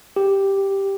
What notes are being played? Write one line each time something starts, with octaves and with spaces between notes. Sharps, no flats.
G4